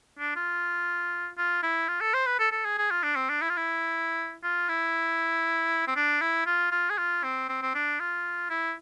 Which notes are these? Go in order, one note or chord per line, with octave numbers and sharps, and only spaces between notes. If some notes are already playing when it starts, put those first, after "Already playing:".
D4
F4
F4
E4
F4
A4
C5
B4
A4
A4
G#4
G#4
F4
D4
C4
D4
E4
F4
E4
F4
E4
C4
D4
E4
F4
F4
G#4
F4
C4
C4
C4
D4
F4
E4